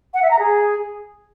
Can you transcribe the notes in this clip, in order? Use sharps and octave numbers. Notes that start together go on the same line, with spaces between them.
F#5
E5
A#5
G#4